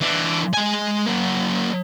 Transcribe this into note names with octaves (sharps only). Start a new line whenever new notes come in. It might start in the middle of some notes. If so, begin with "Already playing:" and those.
E3 D4
G#3 G#5
F#3 A#3